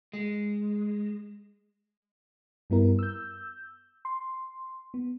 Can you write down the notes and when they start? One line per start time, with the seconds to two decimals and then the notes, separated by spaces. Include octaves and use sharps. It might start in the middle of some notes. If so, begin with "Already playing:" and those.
0.13 G#3
2.70 G2 G3 B3 E4 A#4
2.99 E6 G6
4.05 C6
4.94 B3